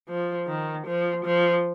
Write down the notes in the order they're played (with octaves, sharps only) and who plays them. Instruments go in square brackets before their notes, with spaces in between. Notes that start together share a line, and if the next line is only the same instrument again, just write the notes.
[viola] F3
D#3
F3
F3